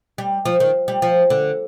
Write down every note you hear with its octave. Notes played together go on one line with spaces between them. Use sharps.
G3
F3
D#3
G3
F3
D3